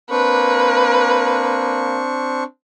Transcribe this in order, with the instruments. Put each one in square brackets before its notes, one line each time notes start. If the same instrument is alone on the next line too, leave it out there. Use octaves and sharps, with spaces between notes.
[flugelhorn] A#3 [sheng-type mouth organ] C4 D4 C#6 [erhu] B4